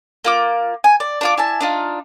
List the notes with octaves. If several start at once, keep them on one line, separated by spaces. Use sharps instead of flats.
A#3 F4 D6
G#5
D5
D4 F4 D6
E4 G#5 A5
D4 D#4 F4